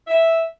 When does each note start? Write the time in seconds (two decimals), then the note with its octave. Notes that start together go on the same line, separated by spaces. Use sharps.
0.08 E5